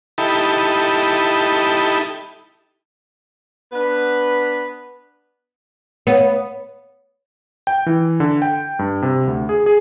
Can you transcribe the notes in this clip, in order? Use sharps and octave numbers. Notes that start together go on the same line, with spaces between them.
D#4 E4 G4 A4 B5
B3 D4 B4
B3 C#5
G5
E3
D3
G5
G2
C3
D2
G#4
G#4